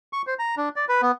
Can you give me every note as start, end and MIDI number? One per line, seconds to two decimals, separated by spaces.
0.13 0.22 85
0.27 0.34 72
0.39 0.55 82
0.57 0.69 62
0.76 0.85 74
0.89 1.01 71
1.02 1.12 59